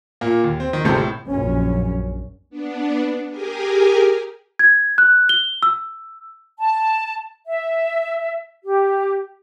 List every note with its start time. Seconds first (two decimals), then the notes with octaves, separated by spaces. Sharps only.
0.21 A#2 A#3
0.44 D#2
0.60 C4
0.73 D#3
0.85 G1 G#2 C3 A4 G6
0.97 A2
1.29 A#1 F#2 C#4
2.50 B3 D4
3.30 G4 G#4 A#4 G#5
4.59 G#6
4.98 F#6
5.29 G7
5.63 E6
6.59 A5
7.47 E5
8.64 G4